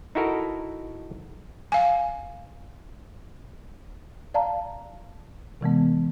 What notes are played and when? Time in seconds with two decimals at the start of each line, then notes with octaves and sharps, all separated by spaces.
0.15 D#4 E4 F#4 A4 A#4
1.72 F5 G#5
4.34 D5 F5 A5 A#5
5.61 C3 E3 G#3 B3